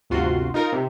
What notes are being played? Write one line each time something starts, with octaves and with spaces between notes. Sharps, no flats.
G1 D2 C3 F4 F#4 C6
D#4 F4 A#4
C3